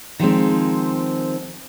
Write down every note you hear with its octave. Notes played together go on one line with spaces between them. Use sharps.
D#3 F3 G#3 C4